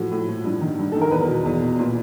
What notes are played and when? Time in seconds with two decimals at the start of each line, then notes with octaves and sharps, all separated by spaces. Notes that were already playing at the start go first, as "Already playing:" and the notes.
Already playing: A2 F3 F#4
0.12 A2
0.28 F3
0.44 G2
0.61 D#3
0.78 G2
0.92 D#3 A4
1.01 A#4
1.11 E2 B4
1.28 B2
1.45 E2
1.62 B2
1.79 A#2